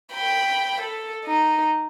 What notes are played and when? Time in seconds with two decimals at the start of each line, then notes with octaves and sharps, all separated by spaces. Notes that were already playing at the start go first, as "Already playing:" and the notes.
0.13 G5 B5
0.81 A4
1.25 D#4